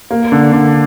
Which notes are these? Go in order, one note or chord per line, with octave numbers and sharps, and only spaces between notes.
A#3
D3
D3